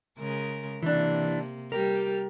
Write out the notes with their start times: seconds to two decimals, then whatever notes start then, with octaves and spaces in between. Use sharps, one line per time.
0.18 C#3 G#3 A#4
0.83 C3 E3 A#3 D4
1.72 G3 G4 A#4